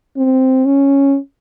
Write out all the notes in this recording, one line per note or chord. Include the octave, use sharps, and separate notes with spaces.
C4
C#4